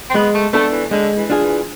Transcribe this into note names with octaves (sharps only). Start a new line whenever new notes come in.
C4
G#3 B3
A3
A3 B3 D4 A4
E3
D3 G#3
E3
D4 F4 G#4
E3